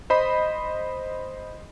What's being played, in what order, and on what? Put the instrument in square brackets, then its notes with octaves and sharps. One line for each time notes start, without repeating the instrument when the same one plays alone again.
[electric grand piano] C5 D#5 B5